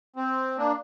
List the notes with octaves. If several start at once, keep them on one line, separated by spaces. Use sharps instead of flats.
C4
A#3 D4